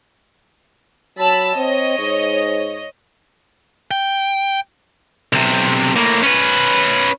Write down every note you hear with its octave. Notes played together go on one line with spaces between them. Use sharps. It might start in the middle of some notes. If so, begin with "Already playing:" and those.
F#3 A5 B5 E6
C4 C#5 D#5
G#2
G5
B1 C3
A2 A#3
C#4 B4